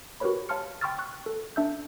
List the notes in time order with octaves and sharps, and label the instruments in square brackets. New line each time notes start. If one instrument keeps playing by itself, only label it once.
[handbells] F#4 G4 A#4 B4 C#5 B5
C#5 F5 A5 C6 F6 C#7
G5 C6 C#6 E6 F6 A6
C#6 F#6
A4
D4 E5 E6 G6